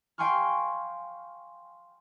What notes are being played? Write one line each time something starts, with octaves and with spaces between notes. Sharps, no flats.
F5 G5 G#5 C6 C#6 F6